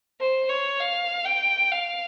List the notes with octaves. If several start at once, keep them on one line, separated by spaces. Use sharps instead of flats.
C5
C#5
F5
G5
F5